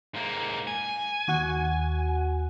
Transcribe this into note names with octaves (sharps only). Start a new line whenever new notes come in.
G#2 A#3
G#5
D#2 F#4 F#5